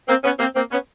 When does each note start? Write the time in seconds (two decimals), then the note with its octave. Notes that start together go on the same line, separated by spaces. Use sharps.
0.08 A#3 C4
0.24 B3 C#4
0.39 A#3 C4
0.55 A#3 C4
0.71 B3 C#4